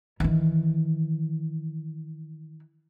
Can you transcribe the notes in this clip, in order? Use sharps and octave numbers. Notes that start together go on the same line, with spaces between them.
D#3 E3